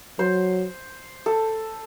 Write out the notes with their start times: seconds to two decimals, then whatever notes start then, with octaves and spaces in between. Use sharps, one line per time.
0.19 F#3 C5
1.26 A4